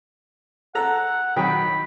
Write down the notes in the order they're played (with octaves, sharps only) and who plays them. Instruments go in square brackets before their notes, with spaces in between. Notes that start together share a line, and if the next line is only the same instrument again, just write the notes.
[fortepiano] A4 A#5 [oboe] F#5
[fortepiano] D#3 F#3 G5 [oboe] B5